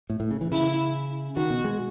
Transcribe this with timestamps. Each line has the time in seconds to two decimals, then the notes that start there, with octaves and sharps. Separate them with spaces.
0.10 A2
0.20 A2
0.31 C#3
0.41 E3
0.52 C#3 E4
1.36 D#3 F#4
1.50 B2
1.64 G#3